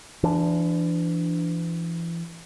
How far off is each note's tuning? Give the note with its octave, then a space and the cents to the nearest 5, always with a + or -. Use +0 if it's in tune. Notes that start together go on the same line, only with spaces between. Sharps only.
E3 +35 D4 +0